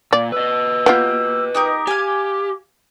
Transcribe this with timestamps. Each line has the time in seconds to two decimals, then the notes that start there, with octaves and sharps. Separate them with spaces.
0.13 A#2 D5 F5
0.32 B4 D#5 E6
0.86 A#3 B3 F4 G4 G6
1.55 D#4 G4 A#4 D6
1.87 G4 F5 G#5